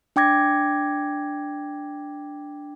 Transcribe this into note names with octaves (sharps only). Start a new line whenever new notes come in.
D4 G5 D6 G#6 A#6